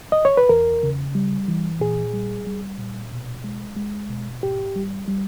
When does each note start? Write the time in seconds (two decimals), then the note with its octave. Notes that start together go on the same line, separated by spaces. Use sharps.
0.12 D#5
0.25 C#5
0.37 B4
0.49 E2 A#4
0.83 C#3
1.15 G3
1.48 E3
1.80 A#2 G#4
2.13 G3
2.46 G3
2.78 A#2
3.11 B2
3.44 G#3
3.76 G#3
4.09 B2
4.42 G#2 G4
4.76 G3
5.08 G3